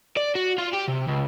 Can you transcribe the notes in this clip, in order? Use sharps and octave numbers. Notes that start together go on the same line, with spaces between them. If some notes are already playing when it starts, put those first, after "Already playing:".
D5
F#4
F4
G4
C3
C#2